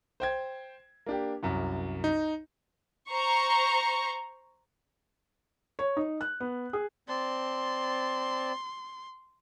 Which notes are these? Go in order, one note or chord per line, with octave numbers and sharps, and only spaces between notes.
C5 G5 G#6
A#3 D4 G4
C2 F#2
D#4
C5 A#5 C#6
C#5
D#4
F#6
B3
G#4
C4 D5 A5 C6